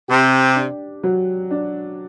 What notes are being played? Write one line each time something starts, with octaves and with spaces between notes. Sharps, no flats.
C3 G4
D4
F#3
D4